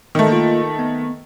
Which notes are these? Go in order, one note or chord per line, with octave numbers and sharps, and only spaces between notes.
D#3 A3
A#3 F4
B3